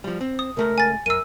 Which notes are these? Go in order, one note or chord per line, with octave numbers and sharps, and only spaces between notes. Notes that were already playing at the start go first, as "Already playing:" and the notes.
F3 G3
C4
D#6
C#2 A3 A#4 A#5
G#5 A6
F#2 A#4 E6 D#7